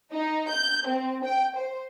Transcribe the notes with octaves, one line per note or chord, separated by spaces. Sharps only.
D#4
G6
C4
G5
C5